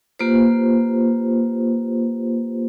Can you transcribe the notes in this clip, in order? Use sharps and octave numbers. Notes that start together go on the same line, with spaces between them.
A#3 F4 G4 B4 C5